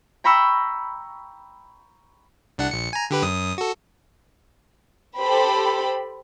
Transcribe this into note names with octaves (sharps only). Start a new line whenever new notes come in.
G5 A#5 B5 C#6 E6
C2 D4 F#5
A#1 C#7
G#5 A#5
D3 G4 B4
F#2 D#6
F#4 A4
G4 A4 C5 G5 B5